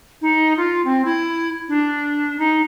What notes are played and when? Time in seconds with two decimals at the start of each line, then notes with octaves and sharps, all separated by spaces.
0.22 D#4
0.57 F4
0.85 C4
1.05 E4
1.69 D4
2.39 D#4